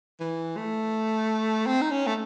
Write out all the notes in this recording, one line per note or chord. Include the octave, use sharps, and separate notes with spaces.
E3
A3
C4
D#4
C#4
A3